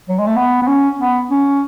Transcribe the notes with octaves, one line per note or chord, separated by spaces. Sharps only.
F#3
G#3
A3
B3
B3
C#4
B3
C#4